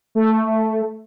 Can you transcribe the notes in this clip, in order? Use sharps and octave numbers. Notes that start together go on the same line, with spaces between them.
A3